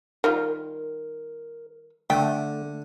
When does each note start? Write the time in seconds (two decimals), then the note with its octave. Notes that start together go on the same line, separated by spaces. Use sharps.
0.24 D#3 G3 F4 A#4
2.10 D3 A3 G5